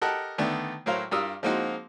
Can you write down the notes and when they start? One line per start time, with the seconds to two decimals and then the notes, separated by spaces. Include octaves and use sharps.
0.02 G4 A4 A#4 D#5 F#5 A5
0.38 D3 D#3 A3 B3 D4
0.86 A2 F#3 A#4 C5 F5
1.11 G2 G3 F4 A#4 D#6 E6
1.43 F3 G#3 A#3 C4 D#4 F#4